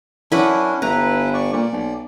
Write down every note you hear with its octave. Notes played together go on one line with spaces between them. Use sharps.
F#2 C#4 D4 E4 B4 F#5
G1 E4 B4 A#5
D5 C#6
A#2 D5
B1